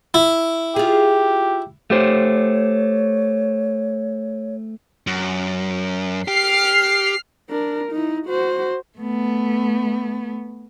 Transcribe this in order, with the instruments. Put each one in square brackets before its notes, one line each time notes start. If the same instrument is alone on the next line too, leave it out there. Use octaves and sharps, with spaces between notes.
[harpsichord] E4
[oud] F4 G#4 [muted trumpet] G4
[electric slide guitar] A3 G4 C5 [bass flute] C#5
[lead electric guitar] F#2
[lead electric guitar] G4 [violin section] F6 C7
[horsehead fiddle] D4 A#4
D#4 E4
F#4 C5
[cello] A3 B3